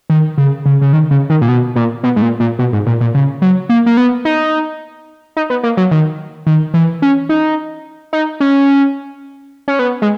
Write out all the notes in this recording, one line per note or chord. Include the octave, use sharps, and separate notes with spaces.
D#3
C#3
C#3
C#3
D#3
C#3
D#3
A#2
B2
A#2
B2
G#2
A#2
A#2
B2
G#2
A#2
A#2
C#3
F#3
A#3
A#3
B3
D#4
D#4
B3
A#3
F#3
D#3
D#3
E3
C#4
D#4
D#4
C#4
C#4
B3
G#3